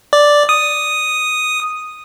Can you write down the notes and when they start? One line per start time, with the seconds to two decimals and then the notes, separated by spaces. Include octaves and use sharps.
0.13 D5
0.49 D#6